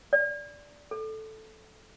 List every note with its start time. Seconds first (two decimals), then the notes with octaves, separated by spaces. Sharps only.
0.13 D5
0.91 A4